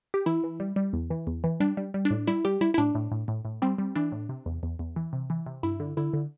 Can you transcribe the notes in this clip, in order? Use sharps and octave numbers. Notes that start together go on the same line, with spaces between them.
G4
E3 E4
E3
G3
G3
E2
E3
E2
E3
G3 D4
G3
G3
D4
A2
G3 E4
G3 G4
G3 E4
E4
A2 D4
A2
A2
A2
A2
G3 C4
G3
E3 D4
A2
C3
E2
E2
E2
E3
C3
E3
C3
G2 E4
D3
D3 E4
D3